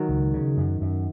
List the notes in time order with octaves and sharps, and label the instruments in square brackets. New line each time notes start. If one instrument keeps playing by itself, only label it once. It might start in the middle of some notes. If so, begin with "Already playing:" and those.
Already playing: [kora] D#3 F#3
[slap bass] C#2
C#3
F#2
F#2